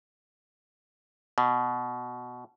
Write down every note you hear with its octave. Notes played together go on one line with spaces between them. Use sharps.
B2